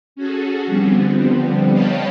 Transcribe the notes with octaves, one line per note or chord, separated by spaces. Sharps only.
C#4 F#4 G#4 A4
D3 F3 G3 B3 C4
C#5 D#5 F5 G5 A5 B5